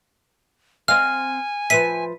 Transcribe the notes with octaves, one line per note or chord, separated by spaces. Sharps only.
C4 D#5 F5 G#5 F6
F3 B4 E5 B6 D#7